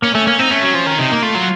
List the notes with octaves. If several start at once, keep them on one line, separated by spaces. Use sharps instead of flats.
A#3 C#4
A3 C#4
A#3 C#4
C4 D#4
A3 C#4
F#3
F3
D#3
C3 D#4
A#3
A3 F4
F#3